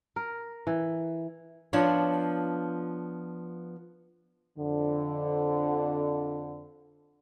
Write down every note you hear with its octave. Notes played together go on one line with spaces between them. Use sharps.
A#4
E3
F3 B3 D4 F4 C#5
F2 D3